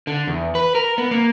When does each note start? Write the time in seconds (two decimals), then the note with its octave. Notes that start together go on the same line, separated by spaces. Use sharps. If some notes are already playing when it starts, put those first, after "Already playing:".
0.07 D3
0.27 E2
0.55 B4
0.75 A#4
0.98 B3
1.11 A#3